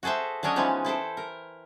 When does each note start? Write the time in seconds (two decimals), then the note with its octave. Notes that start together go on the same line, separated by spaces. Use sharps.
0.03 F#4 G#4 A4 C5 E5
0.43 F#3 C#4 D4 C#5 D#5
0.56 E3 F3 G#3 B3 C#4 D#4
0.85 E4 A4 C5 G5
1.17 A#4